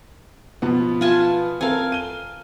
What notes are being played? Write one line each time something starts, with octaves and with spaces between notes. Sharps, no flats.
B2 F3 B3
F4 G#5 A5
C4 A4 A#4 F5 G#5
D#7 G7